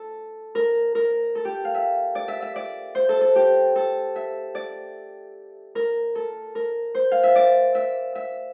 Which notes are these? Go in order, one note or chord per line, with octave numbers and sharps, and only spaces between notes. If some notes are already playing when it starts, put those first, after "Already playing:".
Already playing: A4
A#4
A#4
A4
G4
F5
E5
D5
E5
E5
D5
C5
A4
A4
G4
A4
E5
D5
A#4
A4
A#4
C5
F5
E5
D5
E5
E5